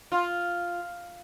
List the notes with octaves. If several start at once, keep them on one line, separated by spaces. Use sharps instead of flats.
F4